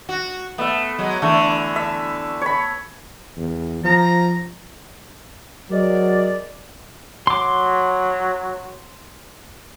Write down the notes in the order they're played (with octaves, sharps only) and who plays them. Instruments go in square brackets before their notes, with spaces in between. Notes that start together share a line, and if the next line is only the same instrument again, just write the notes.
[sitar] F#4
[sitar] A3 [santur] B3 E5
[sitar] F#3 G#3
[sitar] D3 E3 [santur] A3
[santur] E5
C#5 B5
[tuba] E2
[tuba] F3 [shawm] A#5
[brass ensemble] F#3 [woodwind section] G#3 A#4 D5
[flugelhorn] F#3 [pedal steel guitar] C6 D6